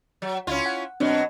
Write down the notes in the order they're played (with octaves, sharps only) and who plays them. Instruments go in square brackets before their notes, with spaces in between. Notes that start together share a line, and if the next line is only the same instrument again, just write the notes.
[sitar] F#3
[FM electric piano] C#2 [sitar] C#4 E4 F4
[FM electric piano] F#5
[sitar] B2 F#3 [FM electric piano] C4 D4